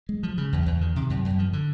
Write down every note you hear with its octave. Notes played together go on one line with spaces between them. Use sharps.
G#3
F3
C#3
E2
E2
D#3
C3
F#2
F#2
F3
D3